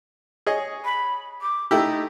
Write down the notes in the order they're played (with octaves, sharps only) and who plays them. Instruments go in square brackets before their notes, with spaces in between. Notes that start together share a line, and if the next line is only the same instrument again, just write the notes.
[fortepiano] G#4 C#5 D#5
[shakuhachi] B5
D6
[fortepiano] A3 E4 G4 [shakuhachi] D#4